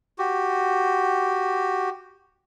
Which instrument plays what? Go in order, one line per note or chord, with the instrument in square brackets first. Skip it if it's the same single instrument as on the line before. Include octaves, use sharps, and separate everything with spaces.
[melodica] F#4 G4